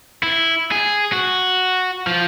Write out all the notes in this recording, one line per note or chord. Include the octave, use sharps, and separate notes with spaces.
E4
G#4
F#4
F3